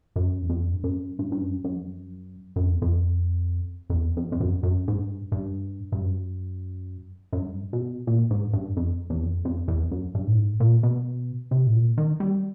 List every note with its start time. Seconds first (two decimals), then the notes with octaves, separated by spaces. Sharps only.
0.16 F#2
0.42 E2
0.49 F2
0.74 G2
0.84 F#2
1.19 G2
1.32 G2
1.41 F#2
1.64 F#2
1.75 F2
1.87 F#2
2.56 F#2
2.64 F2
2.73 E2
2.82 F2
3.90 F2
3.95 E2
4.17 F2
4.32 F2
4.40 F#2
4.63 F#2
4.88 G#2
4.97 G2
5.32 G2
5.92 G2
6.01 F#2
7.32 F#2
7.39 G2
7.73 B2
8.07 A#2
8.31 G#2
8.53 G2
8.77 F2
9.10 E2
9.22 F2
9.45 F2
9.68 E2
9.91 F#2
10.15 G2
10.27 A2
10.38 G#2
10.60 A#2
10.83 B2
11.51 C3
11.66 A2
11.75 A#2
11.97 D#3
12.20 G3